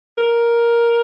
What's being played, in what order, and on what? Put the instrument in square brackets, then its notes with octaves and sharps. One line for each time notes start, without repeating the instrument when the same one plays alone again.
[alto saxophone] A#4